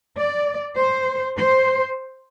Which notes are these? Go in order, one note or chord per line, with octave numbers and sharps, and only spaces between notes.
D5
C5
C5